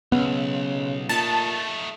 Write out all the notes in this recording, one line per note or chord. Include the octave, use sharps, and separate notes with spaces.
B1 C#3 B3
A#2 A3 D#4 A5